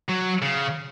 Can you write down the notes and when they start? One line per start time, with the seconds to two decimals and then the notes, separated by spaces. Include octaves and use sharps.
0.09 F#3
0.42 C#3